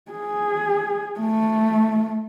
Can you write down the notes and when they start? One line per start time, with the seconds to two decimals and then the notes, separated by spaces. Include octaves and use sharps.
0.12 G#4
1.20 A3